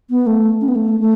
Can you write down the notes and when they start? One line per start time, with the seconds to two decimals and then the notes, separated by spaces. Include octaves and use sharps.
0.10 B3
0.27 A3
0.61 C#4
0.68 B3
0.76 A3
1.00 A3